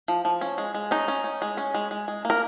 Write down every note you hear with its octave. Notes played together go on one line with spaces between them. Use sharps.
F3
F3
C#4
G#3
G#3
C#4 D#4
C#4
C#4
G#3
C#4
G#3
G#3
G#3
A#3
A#4